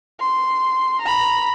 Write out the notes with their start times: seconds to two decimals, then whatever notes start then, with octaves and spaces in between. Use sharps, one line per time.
0.20 C6
1.02 A#5 B5